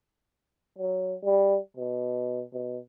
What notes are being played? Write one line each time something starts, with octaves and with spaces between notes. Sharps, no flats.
F#3
G3
B2
B2